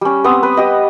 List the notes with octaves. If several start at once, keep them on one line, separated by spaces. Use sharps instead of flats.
G3 C#4
B3 C4 D#6
B4
G4 D#5